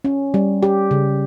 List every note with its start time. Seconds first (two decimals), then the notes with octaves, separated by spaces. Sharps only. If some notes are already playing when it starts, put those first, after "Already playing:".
0.04 C#4
0.34 G3
0.63 G4
0.91 C#3